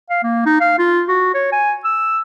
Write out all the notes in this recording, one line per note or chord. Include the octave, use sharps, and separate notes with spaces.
F5
A#3
D#4
F5
F4
F#4
C#5
G#5
E6